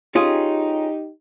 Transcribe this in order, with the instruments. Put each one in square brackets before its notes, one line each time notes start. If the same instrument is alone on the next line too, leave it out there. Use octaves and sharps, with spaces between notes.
[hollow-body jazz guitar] C#4 F4 G#4 [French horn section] D#4 G4